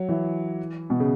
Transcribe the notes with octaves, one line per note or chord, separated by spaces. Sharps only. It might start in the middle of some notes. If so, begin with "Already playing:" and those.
Already playing: F#3
E3
B2
C#3